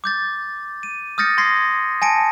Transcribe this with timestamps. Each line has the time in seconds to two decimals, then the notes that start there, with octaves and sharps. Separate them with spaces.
0.04 D6 G6 A6
0.83 D#7
1.18 D#6 F6 G6 A6 A#6 C#7
1.38 C6 G#6 A#6 C7
2.02 G#5 A5 A#6 C#7 D7